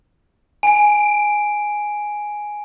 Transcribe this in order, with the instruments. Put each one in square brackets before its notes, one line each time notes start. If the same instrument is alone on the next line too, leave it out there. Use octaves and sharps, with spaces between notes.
[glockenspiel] G#5 D7